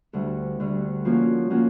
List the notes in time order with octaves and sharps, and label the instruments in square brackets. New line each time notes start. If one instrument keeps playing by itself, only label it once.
[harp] D2 D3 G3
D2 D3 G3
F3 A#3 C#4 F#4
F3 A#3 C#4 F#4